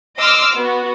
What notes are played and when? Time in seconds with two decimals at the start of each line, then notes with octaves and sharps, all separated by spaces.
0.19 D#5 C6 D6 E6 F6
0.55 B3 F#4